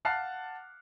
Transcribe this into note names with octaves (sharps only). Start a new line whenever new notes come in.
F5 F#5 A5 F6 F#6 C7